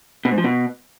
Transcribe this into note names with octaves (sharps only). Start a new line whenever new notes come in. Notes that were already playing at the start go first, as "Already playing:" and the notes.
B2
G#2
F3
B2